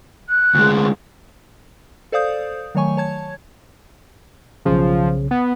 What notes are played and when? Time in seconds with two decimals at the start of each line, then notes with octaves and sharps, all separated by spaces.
0.29 F#6
0.55 D2 G#3
2.12 A4 C5 D5 F5 D#6 G6
2.75 D#3 F#3 A3 C#5 G#5 C#6
2.97 C#5 A5 G#6
4.66 B1 C#3 F3
5.31 B3